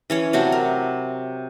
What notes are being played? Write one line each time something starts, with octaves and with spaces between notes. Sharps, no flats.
E3 C#4 C#5
C3 F#3 A3 F#4
A#4